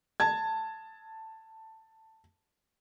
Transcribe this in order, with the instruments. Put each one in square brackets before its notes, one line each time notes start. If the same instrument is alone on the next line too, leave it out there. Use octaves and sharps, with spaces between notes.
[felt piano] A5 G#6